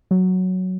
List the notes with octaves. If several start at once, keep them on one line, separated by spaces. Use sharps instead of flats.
F#3